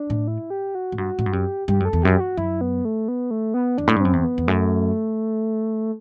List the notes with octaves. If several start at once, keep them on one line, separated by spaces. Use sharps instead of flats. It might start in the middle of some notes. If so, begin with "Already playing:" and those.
Already playing: D4
A2
E4
G4
F#4
A2
G2 F#4
A2
G2
F#2 G4
G2 G4
F#2 A4
E2
F#2 G4
G4
F#4
F#2 E4
B3
A3
B3
A3
B3
E2 D4
A2
G2
F#2 C4
E2
B3
E2
F#2 A3